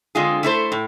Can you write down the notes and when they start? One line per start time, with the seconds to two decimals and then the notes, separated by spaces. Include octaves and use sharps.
0.15 D3 G#3 C4 F4 G#4
0.43 A3 E4 A4 C5
0.72 A2